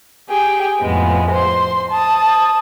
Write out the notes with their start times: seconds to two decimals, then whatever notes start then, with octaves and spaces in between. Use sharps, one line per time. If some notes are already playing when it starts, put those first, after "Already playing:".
0.28 G4 G#4 G5
0.80 F2 A2 G#3 B3
1.31 C5 C6
1.90 A5 D#6